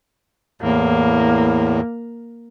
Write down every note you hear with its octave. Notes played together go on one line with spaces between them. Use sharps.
E2 A2 A#3